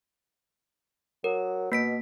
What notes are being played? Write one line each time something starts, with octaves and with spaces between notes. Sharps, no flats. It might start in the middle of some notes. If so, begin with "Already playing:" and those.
F#3 A#4
B2 A#3 B6 D7